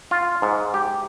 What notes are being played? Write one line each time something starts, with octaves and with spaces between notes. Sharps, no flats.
F4
G#2
G4